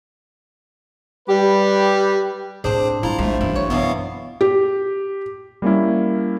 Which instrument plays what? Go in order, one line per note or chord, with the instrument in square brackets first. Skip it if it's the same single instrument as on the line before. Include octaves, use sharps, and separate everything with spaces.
[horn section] G3 G4 B4
[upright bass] A2 [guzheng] C4 D4 [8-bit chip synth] G#4 C5
[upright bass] F#3 [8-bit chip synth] E4 A#5 [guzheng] F4
[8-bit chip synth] A#1 A3 [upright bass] G#3 [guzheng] C5
[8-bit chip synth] A1 [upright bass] F#2 G#3 [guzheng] E4
[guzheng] C#5
[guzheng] E2 B2 E4 [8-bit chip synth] B3 F5
[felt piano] G4
[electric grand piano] G3 A#3 C#4 E4